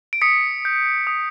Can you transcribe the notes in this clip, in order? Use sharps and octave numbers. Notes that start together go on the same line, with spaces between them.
D7
D#6 B6 C#7
G6
D#6